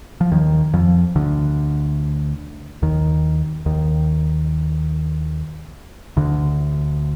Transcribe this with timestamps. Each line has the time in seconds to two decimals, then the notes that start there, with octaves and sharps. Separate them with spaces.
0.21 F3
0.32 D#2 D#3
0.73 F2 F3
1.16 D2 D3
2.82 D#2 D#3
3.66 D#2 D#3
6.17 D2 D3